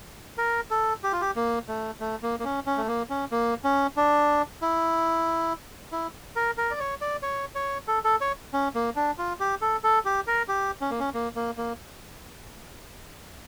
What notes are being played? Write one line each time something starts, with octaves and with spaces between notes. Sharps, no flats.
A#4
A4
G4
F4
G4
A#3
A3
A3
A#3
A#3
C#4
C#4
A3
A#3
C#4
A#3
C#4
D4
E4
E4
A#4
A#4
D5
C#5
D5
C#5
C#5
A4
A4
C#5
C#4
A#3
D4
F4
G4
A4
A4
G4
A#4
G4
C#4
A#3
C#4
A#3
A#3
A#3